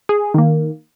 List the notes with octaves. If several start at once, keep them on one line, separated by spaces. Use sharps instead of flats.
G#4
D#3 A#3